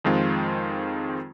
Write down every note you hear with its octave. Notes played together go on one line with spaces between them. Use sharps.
F2 D#3 G#3 C4 F4